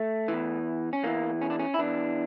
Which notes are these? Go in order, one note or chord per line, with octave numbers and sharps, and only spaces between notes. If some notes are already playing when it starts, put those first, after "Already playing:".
Already playing: A3
E2 E3
C#4
E2 E3 A#3
C#4
D4
C#4
E4
E2 E3 D4